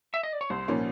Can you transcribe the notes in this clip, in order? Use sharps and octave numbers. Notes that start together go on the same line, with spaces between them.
E5
D#5
D5
C#5
C2 C5
A#2 F3 A#3 C#4